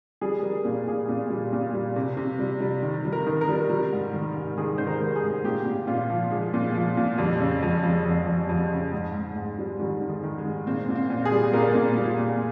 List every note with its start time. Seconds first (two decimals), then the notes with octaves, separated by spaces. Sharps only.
0.21 G3 G#4
0.43 G3 A#4
0.65 A#2
0.87 A#2 G#4
1.09 A#2
1.30 G3
1.53 A#2
1.73 G3
1.96 C3
2.17 C3
2.39 G3
2.61 G3
2.82 D#3
3.05 G3
3.13 A#4
3.27 D#3
3.41 A#4
3.49 G3
3.70 G3
3.92 G#2
4.13 D#3
4.36 G#2
4.57 D#3 G#4
4.78 D#3 C5
4.87 A#4
5.00 G#2
5.16 G#4
5.23 G#2
5.44 A#2 G4
5.65 A#2
5.87 A#2 F4
6.10 F3
6.31 F3 G#3
6.54 A#2
6.74 F3
6.97 A#2
7.18 F2 G3
7.40 C#3
7.62 F2 G#3
7.83 F2
8.05 F2
8.27 F2
8.49 F2
8.71 C#3
8.93 G#2
9.14 G#2
9.36 G#2
9.58 G3
9.80 D#3 G3
10.01 D#3
10.09 G#3
10.23 D#3
10.38 G#3
10.45 G#2
10.67 A#2 C4
10.89 A#2
10.95 C4
11.10 A#2
11.25 G#4
11.32 G3
11.53 A#2 A#4
11.75 A#2
11.98 G3
12.19 A#2